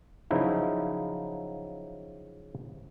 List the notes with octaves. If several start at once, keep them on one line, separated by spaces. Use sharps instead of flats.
C#3 F3 F#3 D#4 E4